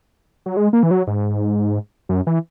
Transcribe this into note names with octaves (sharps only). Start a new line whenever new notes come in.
F#3
G#3
A#3
E3
F#3
G#2
F#2
E3